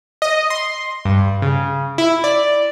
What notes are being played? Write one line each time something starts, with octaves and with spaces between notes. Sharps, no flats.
D#5
C6
G2
C#3
E4
D5